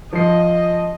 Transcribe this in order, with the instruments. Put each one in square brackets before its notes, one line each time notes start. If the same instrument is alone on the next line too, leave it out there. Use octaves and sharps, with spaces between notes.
[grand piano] F3 C7 [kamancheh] D#5